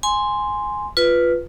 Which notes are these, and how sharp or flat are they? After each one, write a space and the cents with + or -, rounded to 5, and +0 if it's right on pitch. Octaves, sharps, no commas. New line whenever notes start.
G#5 +0 C6 +0
F4 +0 B4 +0